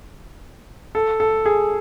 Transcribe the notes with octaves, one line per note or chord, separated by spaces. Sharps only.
A4
A4
G#4